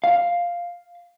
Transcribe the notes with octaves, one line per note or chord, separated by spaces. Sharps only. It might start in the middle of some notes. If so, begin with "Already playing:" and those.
F5